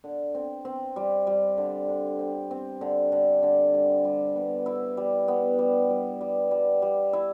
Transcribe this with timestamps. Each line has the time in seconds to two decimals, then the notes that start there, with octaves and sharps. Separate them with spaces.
0.04 D3
0.35 C4
0.65 C4
0.96 G3
1.27 G3
1.58 D3
1.89 D3
2.19 C4
2.51 C4
2.81 D3
3.12 D3
3.43 D3
3.74 G3
4.05 G3
4.36 B3
4.66 E4
4.97 G3
5.28 B3
5.59 G3
5.90 G3
6.21 G3
6.51 G3
6.82 G3
7.13 E4